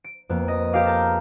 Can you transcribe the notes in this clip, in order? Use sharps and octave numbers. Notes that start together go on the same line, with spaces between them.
D7
F2 A#3 B3
D#5
G4 A#4 F5 D6 D#6
A4 A#4 A5 A#5 G6